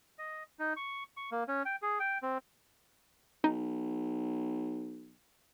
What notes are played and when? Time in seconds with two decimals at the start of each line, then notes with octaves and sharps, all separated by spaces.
0.19 D#5
0.59 D#4
0.76 C#6
1.17 C#6
1.32 A#3
1.48 C#4
1.65 G5
1.82 G#4
2.00 G5
2.23 C4
3.44 B1 D#4